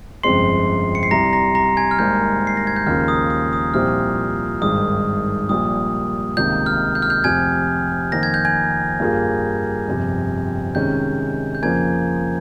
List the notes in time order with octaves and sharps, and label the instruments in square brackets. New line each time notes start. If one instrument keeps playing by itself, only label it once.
[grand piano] G1 F2 C#3 G#3 C4 [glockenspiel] C6 C7
[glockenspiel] C#7
C7
[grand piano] C2 C3 G3 [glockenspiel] A#5 A#6
[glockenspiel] A#5 A#6
A#5 A#6
G#5 G#6
F6
[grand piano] G#1 G#2 G3 A#3 [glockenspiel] G6
[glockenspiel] C7
A#6
G#6
G6
[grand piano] D#2 C#3 F3 A#3 [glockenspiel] F6
[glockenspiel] D#6
D#6
D#6
[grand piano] C2 A#2 F3 C4 G4 [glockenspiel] F6
[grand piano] G#1 G2 D#3 G#3 [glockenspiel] D#6
[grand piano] A#1 A#2 G3 [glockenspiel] D#6
[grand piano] C#2 C3 D#3 A#3 [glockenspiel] G6
[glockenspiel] F6
G6
F6
G6
[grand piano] F1 F2 C3 [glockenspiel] G#5 G#6
[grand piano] F2 D#3 A#3 [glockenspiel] A#6
[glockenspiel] G#6
G6
G#5 G#6
[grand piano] G2 G3 A#3 F4 G#4
G1 F2 C3
[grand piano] C3 D#3 G#3 C#4 [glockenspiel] G6
[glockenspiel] G6
[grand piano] F2 C#3 F3 A#3 [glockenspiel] G#5 G#6